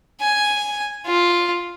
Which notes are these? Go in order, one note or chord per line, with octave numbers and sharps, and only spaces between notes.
G#5
F4